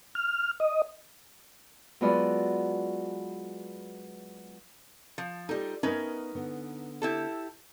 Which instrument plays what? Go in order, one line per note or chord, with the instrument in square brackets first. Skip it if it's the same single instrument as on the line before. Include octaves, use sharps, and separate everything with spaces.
[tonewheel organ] F6
D#5
[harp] F#3 G#3 B3 F4 A4 D5
[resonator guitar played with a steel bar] F3
[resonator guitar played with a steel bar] G3 D#4 [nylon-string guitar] F4 G4 A4
[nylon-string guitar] B3 A#4 E5 [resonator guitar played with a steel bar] C#4 D#4 B4
[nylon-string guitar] D3 B3
[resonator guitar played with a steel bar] E4 G4 A4